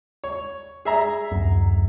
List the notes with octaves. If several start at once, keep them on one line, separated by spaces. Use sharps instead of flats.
C#5
G#4 E5 A#5
D1 F#2